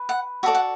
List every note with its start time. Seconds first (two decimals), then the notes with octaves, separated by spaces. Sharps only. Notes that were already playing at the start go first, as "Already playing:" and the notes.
Already playing: B4
0.09 F#5
0.43 F#4 A4 D5 E5
0.55 F#5